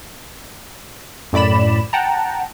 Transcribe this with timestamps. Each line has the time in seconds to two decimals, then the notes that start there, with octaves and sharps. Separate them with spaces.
1.33 F#2 A2 D5 B5 E7
1.93 F#5 G5 A5 A#5